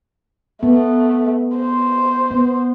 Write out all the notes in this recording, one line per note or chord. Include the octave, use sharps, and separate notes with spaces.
A3 B3
C5
B3